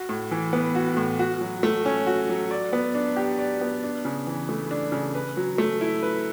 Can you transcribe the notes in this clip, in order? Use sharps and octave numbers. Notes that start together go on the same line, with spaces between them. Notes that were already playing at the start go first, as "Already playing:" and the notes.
Already playing: F#4
A2
E3
B3
F#4
A2
F#4
F#3
A3
C#4
F#4
F#3
D5
B3
D4
G4
D5
B3
D4
C#3
E3
A3
D4
C#3
B4
F#3
A3
E4
B4